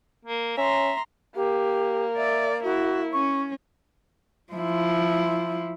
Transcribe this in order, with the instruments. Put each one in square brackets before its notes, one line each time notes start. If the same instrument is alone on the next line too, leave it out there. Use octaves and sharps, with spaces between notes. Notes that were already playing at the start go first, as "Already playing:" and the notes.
[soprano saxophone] A#3
[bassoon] C#4 [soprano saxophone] E5 [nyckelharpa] A#5 C6
[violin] A#3 [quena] G4
[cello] D5 [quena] E5
[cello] E4 [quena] F#4
[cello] C#4 [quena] C#6
[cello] F3 E4